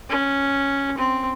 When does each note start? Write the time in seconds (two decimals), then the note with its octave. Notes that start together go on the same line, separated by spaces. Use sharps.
0.09 C#4
0.98 C4